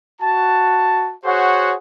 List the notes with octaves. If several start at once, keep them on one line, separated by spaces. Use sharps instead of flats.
F#4 A5
F#4 G#4 C5 C#5 F#5